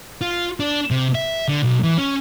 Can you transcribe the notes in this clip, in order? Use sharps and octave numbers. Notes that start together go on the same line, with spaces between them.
F4
D4
C3
E5
D3
B1
E3
C#4